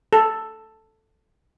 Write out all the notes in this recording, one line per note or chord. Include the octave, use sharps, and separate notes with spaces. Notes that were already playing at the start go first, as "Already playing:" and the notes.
A4